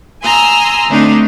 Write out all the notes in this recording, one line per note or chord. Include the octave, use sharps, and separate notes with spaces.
G#5 A#5 C6 D#6 E6
D3 A3 C4 D4 D#4